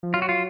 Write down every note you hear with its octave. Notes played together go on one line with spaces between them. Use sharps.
F3
F#3 F4
F#4
F4